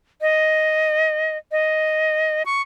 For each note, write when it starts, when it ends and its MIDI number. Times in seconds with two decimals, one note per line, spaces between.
0.21 1.37 75
1.51 2.43 75
2.46 2.62 85